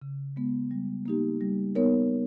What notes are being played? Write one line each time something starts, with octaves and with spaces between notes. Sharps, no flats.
C#3
G#3 B3
G3
A#3 D#4 G4
G3
B3 D#4 A#4 C#5